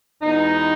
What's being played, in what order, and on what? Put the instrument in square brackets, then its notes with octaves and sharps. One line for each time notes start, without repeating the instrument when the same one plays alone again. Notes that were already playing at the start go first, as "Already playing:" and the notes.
[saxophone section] E2 B2 G#3 B3 D#4